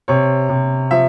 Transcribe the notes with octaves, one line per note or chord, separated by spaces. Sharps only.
C3 C#5
C3
F3 E5